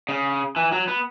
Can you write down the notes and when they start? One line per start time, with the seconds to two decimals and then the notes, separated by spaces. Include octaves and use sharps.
0.09 C#3
0.56 E3
0.72 F#3
0.88 B3